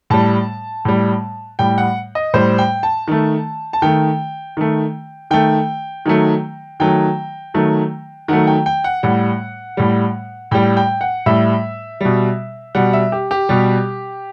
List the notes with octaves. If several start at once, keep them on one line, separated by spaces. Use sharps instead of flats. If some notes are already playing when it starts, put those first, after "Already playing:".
A2 G3 A5
A2 G3
A2 G3 G5
F#5
D#5
A2 G3 C5
G5
A5
D#3 A3
A5
D#3 A3 G5
D#3 A3
D#3 A3 G5
D#3 F#3 A3
D#3 F#3 A3 G5
D#3 F#3 A3
D#3 F#3 A3 F#5
G5
G5
F#5
A2 G3 F#5
A2 G3
A2 G3 G5
G5
F#5
A2 G3 E5
B2 G3
B2 G3 F#5
E5
G4
G4
B2 G3